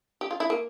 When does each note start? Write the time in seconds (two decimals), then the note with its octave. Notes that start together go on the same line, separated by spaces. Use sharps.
0.21 G4
0.31 F4
0.40 E4
0.50 A#3